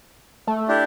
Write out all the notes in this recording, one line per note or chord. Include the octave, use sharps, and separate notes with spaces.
A3
D4 E4 G4